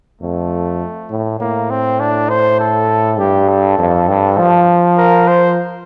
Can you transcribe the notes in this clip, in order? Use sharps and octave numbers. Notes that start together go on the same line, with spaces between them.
F2 A3
A2
A2 A#3
C4
D4
C5
A4
G2 G4
A4
F2
G2
F3
A#4
C5